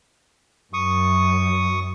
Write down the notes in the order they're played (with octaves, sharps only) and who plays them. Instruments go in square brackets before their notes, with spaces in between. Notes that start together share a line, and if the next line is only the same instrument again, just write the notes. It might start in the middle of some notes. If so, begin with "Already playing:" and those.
[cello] F#2 [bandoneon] C#6 D#6